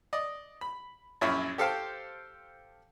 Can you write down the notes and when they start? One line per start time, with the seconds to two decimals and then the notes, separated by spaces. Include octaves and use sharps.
0.13 D5 D#5
0.61 B5
1.21 A#1 F#2 C#4 E4 C#5
1.58 G4 A4 C5 F5 G5 A5